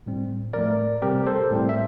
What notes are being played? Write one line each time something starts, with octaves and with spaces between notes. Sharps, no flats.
A2 G3 C4
A2 F3 A3 A#4 D5
C3 G3 C4 G4 A#4
A4 C5
A2 G3 C4
E5